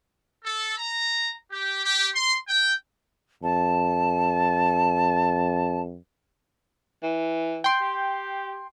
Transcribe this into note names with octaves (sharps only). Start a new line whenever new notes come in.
A4
A#5
G4
G4
C6
G5
F2 A5
E3
G5 C6
G4